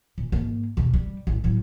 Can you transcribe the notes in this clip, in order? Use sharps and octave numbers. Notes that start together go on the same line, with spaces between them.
A#2
G#2 A#3
E2 B2
G3
A1
A2 F#3